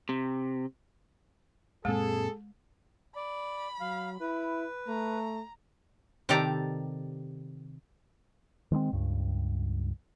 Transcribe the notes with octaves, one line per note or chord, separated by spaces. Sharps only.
C3
F#2 A#2 G#3 C4 G#4 A4
D5 B5
F#3 F5
E4 B4
A3 A#5
C3 D#3 G4 A4 D5 A#5
D#3 G#3 B3 C4
C#2 G2